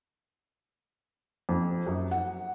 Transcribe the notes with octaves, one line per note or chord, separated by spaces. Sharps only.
F2
F#2
F#5